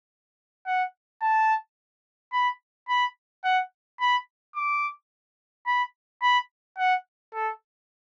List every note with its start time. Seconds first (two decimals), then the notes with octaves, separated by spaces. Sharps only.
0.67 F#5
1.22 A5
2.33 B5
2.89 B5
3.44 F#5
4.00 B5
4.56 D6
5.67 B5
6.22 B5
6.78 F#5
7.34 A4